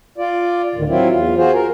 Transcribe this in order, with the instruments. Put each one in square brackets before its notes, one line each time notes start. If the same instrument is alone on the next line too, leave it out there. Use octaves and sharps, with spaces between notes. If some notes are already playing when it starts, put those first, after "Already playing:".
[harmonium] F4 D5
D2 A2 D3 D#3
F#3 C4 E4 F4
E2 F4
F4 F#4 G#4 C5
A#4